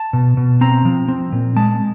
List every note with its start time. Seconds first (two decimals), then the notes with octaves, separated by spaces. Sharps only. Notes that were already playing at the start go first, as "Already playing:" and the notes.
Already playing: A5
0.13 B2
0.37 B2
0.61 C4 A#5
0.85 F3
1.08 C4
1.32 A#2
1.56 G#3 A5